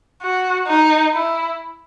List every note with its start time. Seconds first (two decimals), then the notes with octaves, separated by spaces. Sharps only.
0.22 F#4
0.68 D#4
1.13 E4